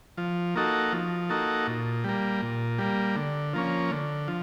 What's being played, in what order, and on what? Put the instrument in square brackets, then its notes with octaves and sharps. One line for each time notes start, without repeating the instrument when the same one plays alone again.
[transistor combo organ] F3
A#3 D#4 F#4 A4
F3
A#3 D#4 F#4 A4
A#2
G3 A#3
A#2
G3 A#3
D3
F3 A#3 C#4
D3
F3